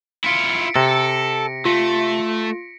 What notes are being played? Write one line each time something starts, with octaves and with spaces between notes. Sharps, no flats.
E4 F4 B6 C#7 D7
C3 A4 A#6 C#7
A3 F4